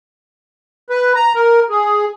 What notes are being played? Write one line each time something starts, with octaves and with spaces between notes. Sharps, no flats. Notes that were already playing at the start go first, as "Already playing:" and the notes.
B4
A#5
A#4
G#4